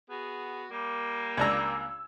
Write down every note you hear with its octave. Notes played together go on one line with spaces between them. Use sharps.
B3 F#4 G#4
G3 A#3
C#2 D4 A#5 E6 G#6